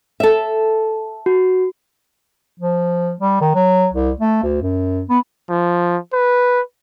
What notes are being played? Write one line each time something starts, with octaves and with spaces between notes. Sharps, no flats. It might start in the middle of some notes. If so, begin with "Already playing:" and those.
A4 E5
F#4
F3
G3
D#3
F#3
C2
A3
D2
F#2
B3
F3
B4